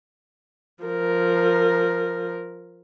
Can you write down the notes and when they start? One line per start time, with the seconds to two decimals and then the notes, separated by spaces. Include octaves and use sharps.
0.83 F3 A#4